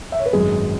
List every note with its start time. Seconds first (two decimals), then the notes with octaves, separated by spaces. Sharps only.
0.12 E5
0.19 C#5
0.26 B4
0.33 G#1 F#2 F#3 G#3 G#4